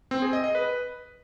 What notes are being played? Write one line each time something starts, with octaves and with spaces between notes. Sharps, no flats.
C4
G#4
D#5
D#5
B4